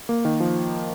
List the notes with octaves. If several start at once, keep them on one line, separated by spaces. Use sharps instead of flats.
A#3
D#3
F3